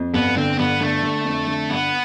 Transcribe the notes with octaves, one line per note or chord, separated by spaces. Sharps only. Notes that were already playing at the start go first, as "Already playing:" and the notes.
Already playing: F2
G1 B3
D3 C4
G1 B3
D3 A3
D3
F2
D3
G1 B3